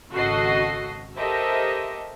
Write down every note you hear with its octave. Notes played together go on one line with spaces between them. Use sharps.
G#1 C#3 F#4 A4 D#5 C7
G4 A4 A#4 C5 D#5 E5